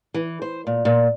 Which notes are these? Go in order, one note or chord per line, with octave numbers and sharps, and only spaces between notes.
E3
C5
A#2
A#2